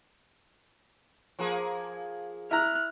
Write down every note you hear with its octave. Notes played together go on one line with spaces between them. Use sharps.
F3 A#3 G#4
E4 A#5 F6 F#6